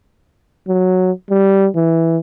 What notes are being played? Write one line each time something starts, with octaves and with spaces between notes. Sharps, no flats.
F#3
G3
E3